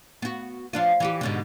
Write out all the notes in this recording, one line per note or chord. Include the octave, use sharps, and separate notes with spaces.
B3 F#4
F3 D4 F4
E3 F#4 G4
G#2 B2 D3